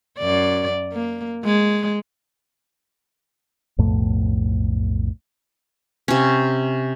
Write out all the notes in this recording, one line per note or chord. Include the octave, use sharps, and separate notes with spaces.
F#2 D5
A#3
G#3
B1 F2 A2 A3
C3 C#4